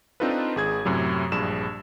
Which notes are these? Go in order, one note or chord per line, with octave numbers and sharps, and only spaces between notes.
C4 D4 D#4 F4 A4 B4
G#1 G#4 G#6
F#2 A2 C3 F#3
A#1 G2 G#4 E7